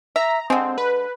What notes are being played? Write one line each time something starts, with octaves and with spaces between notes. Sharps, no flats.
E5 A#5
D3 G#3 C4
B4